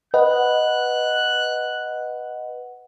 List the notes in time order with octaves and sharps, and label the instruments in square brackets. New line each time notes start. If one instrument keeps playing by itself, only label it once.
[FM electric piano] B4 D#5 F#5 [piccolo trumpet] F#6